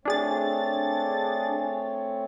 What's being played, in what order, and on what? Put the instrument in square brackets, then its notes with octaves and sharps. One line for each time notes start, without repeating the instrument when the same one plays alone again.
[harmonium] A3 C4 C#5 [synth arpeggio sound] D4 G#4 A6